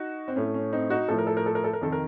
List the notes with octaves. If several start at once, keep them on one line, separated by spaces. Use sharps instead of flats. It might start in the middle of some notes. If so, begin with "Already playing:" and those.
Already playing: D#4 F#4
C4
A2 A3 C#4
C#4
C4 D#4
D#4 F#4
A2 F3 A3 A4
A#4
A4
A#4
A4
A#4
A4
A#4
F2 C3 D#3 A4
A#4